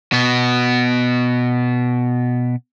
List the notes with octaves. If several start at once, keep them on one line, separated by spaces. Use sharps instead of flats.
B2 B3